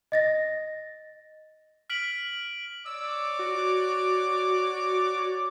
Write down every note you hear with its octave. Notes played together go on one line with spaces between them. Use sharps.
D#5 A6 A#6
F6 B6 D7 F#7
C#5 D5 D6 E6
F#4